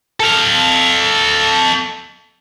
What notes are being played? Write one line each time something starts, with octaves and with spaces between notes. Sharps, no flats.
A4 F5